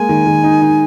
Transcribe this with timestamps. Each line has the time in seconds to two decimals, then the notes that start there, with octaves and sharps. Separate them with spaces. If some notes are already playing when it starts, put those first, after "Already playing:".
Already playing: G#3 A#3 G#5
0.09 D#3
0.26 D#3
0.44 D#4
0.61 D#4